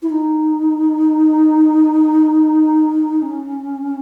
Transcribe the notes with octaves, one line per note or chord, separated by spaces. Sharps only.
E4
D#4
C#4